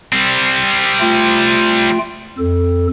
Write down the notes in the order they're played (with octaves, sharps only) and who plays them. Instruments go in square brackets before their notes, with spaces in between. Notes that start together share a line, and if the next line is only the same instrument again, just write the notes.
[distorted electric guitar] G3 C4
[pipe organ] A3 F4 G5
F2 A4